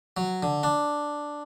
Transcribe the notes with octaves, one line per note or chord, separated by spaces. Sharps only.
F#3
D3
D4